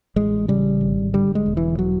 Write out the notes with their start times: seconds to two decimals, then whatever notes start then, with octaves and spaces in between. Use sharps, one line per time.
0.16 A1 G#3
0.48 C#3 G3
0.81 G#1
1.13 D3 G3
1.35 G#3
1.46 E1
1.57 E3
1.79 F#3